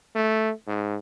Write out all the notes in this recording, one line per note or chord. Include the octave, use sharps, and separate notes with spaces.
A3
G#2